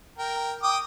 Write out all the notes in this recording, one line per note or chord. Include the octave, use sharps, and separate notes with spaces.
A#4 G5
G5 D6 D#6